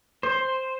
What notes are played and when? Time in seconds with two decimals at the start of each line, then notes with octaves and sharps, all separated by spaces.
0.23 C5